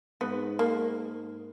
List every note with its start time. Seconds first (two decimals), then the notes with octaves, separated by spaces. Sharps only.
0.21 G#2 B3
0.59 A#3